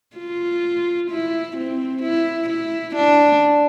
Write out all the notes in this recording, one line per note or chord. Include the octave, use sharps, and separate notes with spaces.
F4
E4
C4
E4
E4
D4